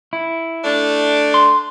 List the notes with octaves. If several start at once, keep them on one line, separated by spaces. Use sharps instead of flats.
E4
A3 D4
C6